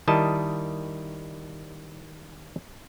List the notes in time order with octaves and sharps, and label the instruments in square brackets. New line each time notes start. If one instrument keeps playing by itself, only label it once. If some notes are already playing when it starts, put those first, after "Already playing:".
[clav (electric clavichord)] D#3 G3 E4 D#5 A5